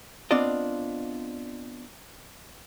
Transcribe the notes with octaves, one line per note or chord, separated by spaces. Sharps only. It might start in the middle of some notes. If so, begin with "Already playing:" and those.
B3 C4 D4 F4 D5 D#5